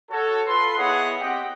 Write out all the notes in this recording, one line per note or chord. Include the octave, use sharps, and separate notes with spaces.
F#4 A4 C#5
F4 A4 B4 C6
B3 E4 G#4 C#5 D#5 F#5
C4 G4 D#5 F#5 G5